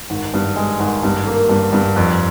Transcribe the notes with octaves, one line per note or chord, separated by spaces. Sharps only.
G#1
G2
G#3
G#1
G2
A#3
G2
G2
F2